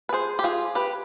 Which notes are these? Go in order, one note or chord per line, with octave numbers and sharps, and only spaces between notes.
B4
G#4 C5
G4
F4 G#4
G4 B4